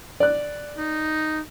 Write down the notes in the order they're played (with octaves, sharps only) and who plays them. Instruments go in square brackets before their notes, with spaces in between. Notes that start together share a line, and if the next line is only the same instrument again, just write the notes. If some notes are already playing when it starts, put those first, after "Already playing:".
[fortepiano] D5 F#6
[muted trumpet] D#4